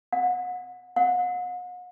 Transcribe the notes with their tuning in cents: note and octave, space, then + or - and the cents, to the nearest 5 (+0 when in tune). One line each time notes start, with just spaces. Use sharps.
F#5 -30
F#5 -40